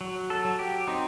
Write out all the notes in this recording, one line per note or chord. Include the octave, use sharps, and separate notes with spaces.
F#3
A4
F#3
G4
C4 D#4